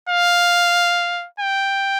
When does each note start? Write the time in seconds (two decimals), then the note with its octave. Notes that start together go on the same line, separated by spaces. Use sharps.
0.09 F5
1.40 G5